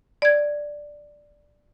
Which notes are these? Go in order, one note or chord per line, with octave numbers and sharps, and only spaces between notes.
D5 G#6